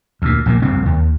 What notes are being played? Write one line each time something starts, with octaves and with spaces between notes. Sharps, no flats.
D2 A#2
A#1 A#2 C#3 A#3
F1 C2 F2 C4
D#2